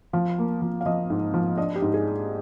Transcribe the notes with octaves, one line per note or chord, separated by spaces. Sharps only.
F3 F5
A#3
F3
F5
F3 D#5
G#2
F3
D4 D#5
G4
G#2
G#4